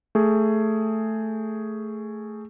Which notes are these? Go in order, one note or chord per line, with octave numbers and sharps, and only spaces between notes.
A3 G#4